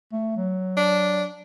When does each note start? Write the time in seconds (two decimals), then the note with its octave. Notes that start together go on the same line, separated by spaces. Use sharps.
0.13 A3
0.37 F#3
0.77 D4